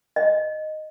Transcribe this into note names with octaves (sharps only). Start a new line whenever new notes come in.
D#5